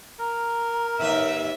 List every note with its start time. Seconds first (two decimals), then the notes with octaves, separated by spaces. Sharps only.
0.19 A#4 A#5
1.01 D#2 B4 E5